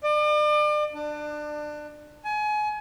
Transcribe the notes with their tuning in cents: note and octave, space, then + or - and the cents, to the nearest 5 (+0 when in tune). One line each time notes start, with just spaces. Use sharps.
D5 +40
D4 +25
G#5 +30